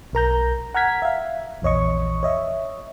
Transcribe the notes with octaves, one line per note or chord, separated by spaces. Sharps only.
B1 A#4 A#5 G6
F#5 A#5 F6 G#6 B6
E5 F5
A#1 E2 C#5 D#5 C#6
C#5 D#5 E5